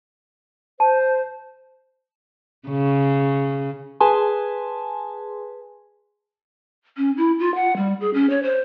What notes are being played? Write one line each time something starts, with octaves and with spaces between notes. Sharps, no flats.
C5 A5
C#3
G#4 B4 G#5 A5 C6
C#4
E4
F4
F#5
G3
G#4
C#4
C#5
C5